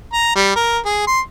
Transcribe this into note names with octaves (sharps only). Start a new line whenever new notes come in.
A#5
G3
A#4
G#4
C6